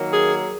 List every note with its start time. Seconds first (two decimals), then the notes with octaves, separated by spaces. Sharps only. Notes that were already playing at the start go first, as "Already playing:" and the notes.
Already playing: D#3 F#3 A#3
0.13 G#4